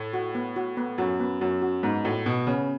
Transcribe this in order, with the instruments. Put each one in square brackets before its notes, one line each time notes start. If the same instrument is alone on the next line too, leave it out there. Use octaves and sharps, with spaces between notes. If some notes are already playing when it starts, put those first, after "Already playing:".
Already playing: [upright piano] A2
[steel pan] F#4
B3
F#4
B3
[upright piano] F#2 [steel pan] F#4
[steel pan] B3
[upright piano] F#2 [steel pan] F#4
[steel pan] F#4
[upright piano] G#2 [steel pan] B3
[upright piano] A2 [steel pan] F#4
[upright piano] B2 [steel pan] B3
[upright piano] C#3 [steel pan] B3